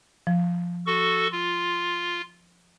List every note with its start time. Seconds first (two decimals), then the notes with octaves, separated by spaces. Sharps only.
0.27 F3
0.87 F#4 A4 C#6
1.32 F4